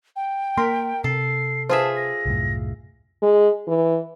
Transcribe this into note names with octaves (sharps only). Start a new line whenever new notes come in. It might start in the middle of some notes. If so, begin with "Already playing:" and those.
G5
A#3 A#4 C6 B6
C3 A4 C7
F4 G#4 B4 C5 E5 A5
A#6
C2 F#2 A2
G#3
E3